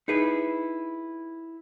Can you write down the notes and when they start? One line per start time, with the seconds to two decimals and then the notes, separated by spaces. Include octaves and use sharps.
0.08 D#4 E4 G#4 B4